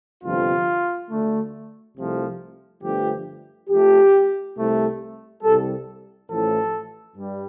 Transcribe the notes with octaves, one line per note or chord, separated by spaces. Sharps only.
G1 F2 C3 F3 F4
D2 D3 A3
C2 C3 F3 A3
G1 G2 F3 A3 G4
F2 F3 A3 G4
C2 C3 A3
C2 C3 G3 A4
A1 A2 F3 A3 A4
G2 G3